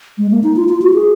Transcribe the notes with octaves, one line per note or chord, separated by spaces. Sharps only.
G#3
A#3
D#4
F4
F4
F#4
G#4